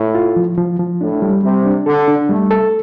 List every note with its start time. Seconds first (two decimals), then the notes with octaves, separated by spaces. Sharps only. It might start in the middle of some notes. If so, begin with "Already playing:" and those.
Already playing: A2
0.15 F4
0.36 F3
0.58 F3
0.79 F3
1.01 A2 D4
1.22 G3
1.44 C3 G3
1.65 D4
1.86 D3 A4
2.08 D4
2.29 G3 A3
2.51 A4